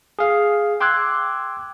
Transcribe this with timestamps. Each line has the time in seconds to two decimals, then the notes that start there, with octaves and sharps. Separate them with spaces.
0.19 G#4 F5
0.80 G5 C6 D6 E6 F#6 G#6